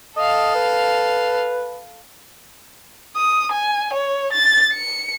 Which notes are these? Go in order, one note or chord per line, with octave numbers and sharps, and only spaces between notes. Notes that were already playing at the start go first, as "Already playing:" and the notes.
A4 D#5 F5
B4
D#6
G#5
C#5
A6
C#7